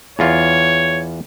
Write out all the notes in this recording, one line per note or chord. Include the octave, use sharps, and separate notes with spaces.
E2 F4 C#5